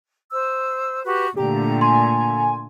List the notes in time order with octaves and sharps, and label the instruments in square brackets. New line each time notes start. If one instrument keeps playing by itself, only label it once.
[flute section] C5 E6
F#4 G4 B4
[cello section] A#2 D3 A3 [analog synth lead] G4 [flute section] A#5
[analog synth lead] G#5 [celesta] C6